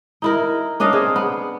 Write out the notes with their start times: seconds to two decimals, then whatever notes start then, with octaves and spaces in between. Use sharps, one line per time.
0.22 D#4 E4 A#4
0.80 C#4 D4 D#5 F5
0.93 C4 G#4
1.16 B3